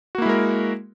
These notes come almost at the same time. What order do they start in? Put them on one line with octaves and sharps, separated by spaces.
F#4 A#3 E4 G#3 A#4